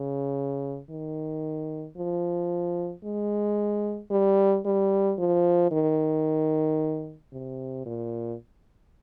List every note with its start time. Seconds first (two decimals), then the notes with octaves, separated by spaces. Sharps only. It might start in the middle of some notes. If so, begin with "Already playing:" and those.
Already playing: C#3
0.90 D#3
1.96 F3
3.04 G#3
4.11 G3
4.65 G3
5.19 F3
5.71 D#3
7.33 C3
7.86 A#2